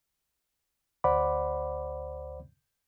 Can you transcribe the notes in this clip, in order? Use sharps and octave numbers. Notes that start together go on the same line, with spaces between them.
D2 C5 D5 F#5 B5 D6